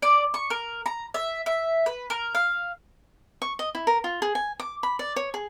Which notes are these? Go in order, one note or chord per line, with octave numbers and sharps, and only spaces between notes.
D5
C#6
A#4
A#5
E5
E5
B4
A#4
F5
C#6
D#5
E4
A#4
F4
G#4
G#5
D6
B5
D5
C#5
G#4